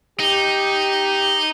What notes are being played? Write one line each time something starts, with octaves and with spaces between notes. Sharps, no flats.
D#4 G4